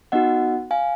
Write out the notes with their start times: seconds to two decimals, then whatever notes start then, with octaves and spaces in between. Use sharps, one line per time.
0.12 B3 D#4 F#4 D#5 F#5
0.71 F5 G#5